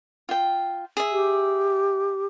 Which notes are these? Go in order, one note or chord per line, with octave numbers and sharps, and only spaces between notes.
F4 G5
G#4 E5
G4